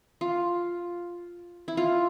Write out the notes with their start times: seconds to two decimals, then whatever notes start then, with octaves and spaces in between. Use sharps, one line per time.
0.21 F4
1.68 E4
1.77 F4